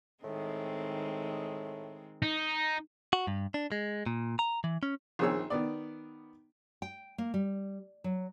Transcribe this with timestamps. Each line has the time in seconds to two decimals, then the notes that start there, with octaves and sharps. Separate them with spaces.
0.24 A2 D#3 G#3 C4
2.22 D#4
3.13 F#4
3.27 G2
3.54 D4
3.72 G#3
4.06 A#2
4.39 A#5
4.64 E3
4.83 C#4
5.19 A#1 D#3 C4 G#4 C#5 E6
5.50 D#3 B3 D5
6.82 G5
7.18 A#3
7.34 G3
8.04 F#3